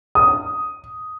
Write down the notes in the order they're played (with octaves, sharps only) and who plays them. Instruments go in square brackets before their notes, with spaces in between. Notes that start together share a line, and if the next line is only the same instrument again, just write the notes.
[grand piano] D#6